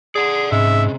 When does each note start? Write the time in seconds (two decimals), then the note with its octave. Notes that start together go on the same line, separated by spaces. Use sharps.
0.16 G#4 D5 F#5
0.52 G#2 C3 G#3 C#4 E5